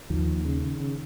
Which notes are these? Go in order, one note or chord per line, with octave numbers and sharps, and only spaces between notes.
D#2 D#3 F3
D#2
C#3
C#3
C#3